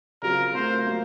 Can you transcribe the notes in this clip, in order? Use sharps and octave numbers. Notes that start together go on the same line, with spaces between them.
C#3 F#3 C4 F4 A#4
A3 C4 F4 A#4 C5
F#3 A#3